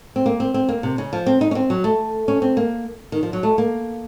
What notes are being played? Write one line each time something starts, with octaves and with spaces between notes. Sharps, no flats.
C4
A#3
C4
C4
A#3
C3
C#3
F3
C4
D#4
C#4
C4
F#3
A3
C#4
C4
A#3
D#3
F3
F#3
A3
A#3